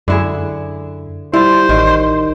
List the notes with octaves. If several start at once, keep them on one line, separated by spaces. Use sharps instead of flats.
F#2 D3 E4 G#4
G3 E4 F4 C5
A1 D#3